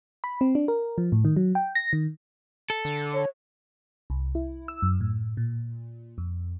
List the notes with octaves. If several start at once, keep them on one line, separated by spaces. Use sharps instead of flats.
B5
C4
D4
A#4
F3
A2
D#3
F#3
G5
A#6
D#3
A4
D3
C#5
C2
E4
E6
F#2
A2
A#2
F2